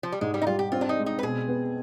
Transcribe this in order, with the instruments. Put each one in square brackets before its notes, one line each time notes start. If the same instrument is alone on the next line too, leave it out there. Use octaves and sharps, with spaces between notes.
[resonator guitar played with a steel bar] F3
G3
[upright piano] G#2 [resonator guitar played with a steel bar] G#3
[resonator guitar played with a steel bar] G3
D#4
[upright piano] G3 [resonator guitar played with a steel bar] F4
[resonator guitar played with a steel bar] G4
[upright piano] C4 [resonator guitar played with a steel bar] F4
[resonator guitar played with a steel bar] D4
D#4
[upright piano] G#3
[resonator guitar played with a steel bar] D#4
B4
[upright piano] B2 [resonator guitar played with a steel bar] G#4
[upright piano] B3